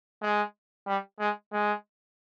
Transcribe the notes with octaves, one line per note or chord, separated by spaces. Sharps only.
G#3
G3
G#3
G#3